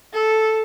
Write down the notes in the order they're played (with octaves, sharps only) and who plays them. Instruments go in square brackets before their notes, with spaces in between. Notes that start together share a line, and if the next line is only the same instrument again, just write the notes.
[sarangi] A4